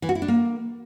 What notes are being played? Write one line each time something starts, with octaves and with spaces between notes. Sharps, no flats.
E3
F#4
E4
D4
A#3